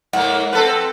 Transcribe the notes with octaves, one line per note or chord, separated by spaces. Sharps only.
G#2 A#3 F#5
C4 A4 B4